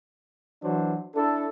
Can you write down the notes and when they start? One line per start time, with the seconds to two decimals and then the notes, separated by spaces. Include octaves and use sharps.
0.63 E3 F#3 D4 F#4 C5
1.15 D4 E4 A4